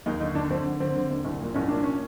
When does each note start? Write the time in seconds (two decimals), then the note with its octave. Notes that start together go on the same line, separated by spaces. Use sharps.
0.06 D#2 D#4
0.20 D3 D#4
0.35 D3 D4
0.50 D3 C4
0.65 D3
0.80 D3 C4
0.95 D3
1.10 D#2
1.25 C2
1.41 A#2
1.54 C2 C#4
1.68 A#2 D4
1.83 C#4